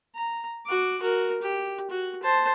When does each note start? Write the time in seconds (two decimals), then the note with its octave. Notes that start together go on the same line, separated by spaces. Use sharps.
0.16 A#5
0.66 F#4 D6
1.01 F#4 A#4
1.42 G4
1.90 F#4
2.23 C5 A5